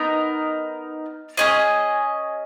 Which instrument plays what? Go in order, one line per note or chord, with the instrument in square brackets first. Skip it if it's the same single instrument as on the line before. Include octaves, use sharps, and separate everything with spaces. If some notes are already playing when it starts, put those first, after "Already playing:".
Already playing: [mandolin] B3 D#4 A#4
C#4 G#4 D#5